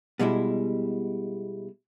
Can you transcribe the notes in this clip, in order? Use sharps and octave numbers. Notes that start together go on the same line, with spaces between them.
B2 G3 G#3 E4